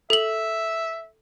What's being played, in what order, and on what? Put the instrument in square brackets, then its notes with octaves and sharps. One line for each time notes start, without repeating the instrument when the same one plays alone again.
[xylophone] A4 F#7 [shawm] E5